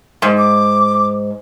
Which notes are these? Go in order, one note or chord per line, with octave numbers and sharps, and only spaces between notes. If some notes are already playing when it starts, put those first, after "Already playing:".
G#2
D6